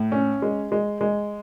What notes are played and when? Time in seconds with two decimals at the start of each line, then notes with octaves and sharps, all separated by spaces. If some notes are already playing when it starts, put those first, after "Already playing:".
Already playing: A2
0.12 C#4
0.42 G#3
0.72 G#3
1.01 G#3